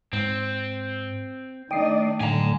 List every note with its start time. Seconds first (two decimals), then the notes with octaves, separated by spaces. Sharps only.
0.13 G#2 C4
1.71 D#3 A3 D4 D5 D#5 G5 C7
2.21 A2 D3 F#3 G#5 A#5